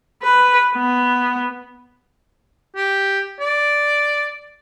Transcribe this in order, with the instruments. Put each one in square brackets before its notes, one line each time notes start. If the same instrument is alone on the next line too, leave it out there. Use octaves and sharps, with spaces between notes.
[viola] B4
B3
[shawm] G4
D5